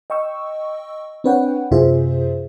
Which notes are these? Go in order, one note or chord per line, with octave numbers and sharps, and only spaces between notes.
D#5 G5 C#6 E6
C4 D4 B4 C#5 F#5 G5
F#2 C3 F4 G#4 C5 E5